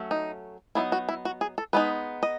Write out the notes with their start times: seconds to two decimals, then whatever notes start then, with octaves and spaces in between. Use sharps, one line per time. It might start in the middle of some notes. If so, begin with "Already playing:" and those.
Already playing: F#3 A3 C#4
0.11 D#4
0.75 F#3 B3 D#4 E4
0.92 F#4
1.09 E4
1.25 F#4
1.41 G#4
1.58 A4
1.73 G#3 B3 D#4 B4
2.23 D#5